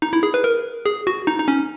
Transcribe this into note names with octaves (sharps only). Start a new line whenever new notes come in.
D#4
E4
G#4
B4
A#4
G#4
F#4
D#4
D#4
C#4